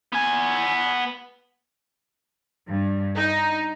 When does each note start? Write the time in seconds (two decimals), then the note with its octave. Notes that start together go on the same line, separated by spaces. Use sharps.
0.13 B3 G#5
2.68 G2
3.15 D#4